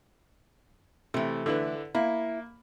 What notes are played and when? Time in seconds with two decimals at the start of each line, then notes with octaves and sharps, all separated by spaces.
1.14 C3 E3 A3
1.46 D3 E4 B4
1.95 A#3 E4